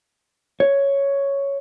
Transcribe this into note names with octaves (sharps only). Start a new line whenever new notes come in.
C#5